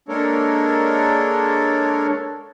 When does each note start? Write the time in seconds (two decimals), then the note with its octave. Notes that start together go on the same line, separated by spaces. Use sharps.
0.08 G#3 A#3 D4 A4 A#4 C#5